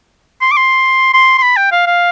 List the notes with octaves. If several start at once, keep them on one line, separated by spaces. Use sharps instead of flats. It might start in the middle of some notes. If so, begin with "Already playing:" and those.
C6
D6
C6
C6
C6
B5
G5
F5
F5